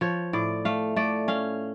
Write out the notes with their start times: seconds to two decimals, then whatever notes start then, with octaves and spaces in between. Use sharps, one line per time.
0.01 F3 C#5
0.33 A2 D5
0.65 A3 F5
0.96 A3 D5
1.28 C#4 F5